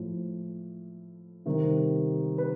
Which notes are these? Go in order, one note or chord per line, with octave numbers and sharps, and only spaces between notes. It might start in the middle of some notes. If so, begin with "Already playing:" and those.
Already playing: A2 F3
C3 D#3 G3
B4